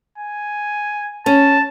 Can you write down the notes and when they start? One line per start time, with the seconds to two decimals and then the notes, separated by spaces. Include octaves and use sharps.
0.18 G#5
1.26 C#4 A5